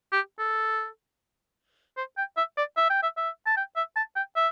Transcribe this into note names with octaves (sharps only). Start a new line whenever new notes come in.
G4
A4
C5
G5
E5
D5
E5
G5
E5
E5
A5
G5
E5
A5
G5
E5